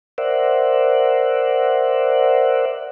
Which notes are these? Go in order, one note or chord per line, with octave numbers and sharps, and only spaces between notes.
A#4 C5 D5 E5 F#5